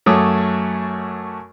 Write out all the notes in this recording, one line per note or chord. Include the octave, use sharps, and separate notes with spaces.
F#2 A3 F#4 C#5 D6 D#6